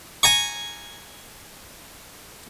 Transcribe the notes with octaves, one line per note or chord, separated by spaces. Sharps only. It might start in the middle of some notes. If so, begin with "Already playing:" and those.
G#5 A#5 C#6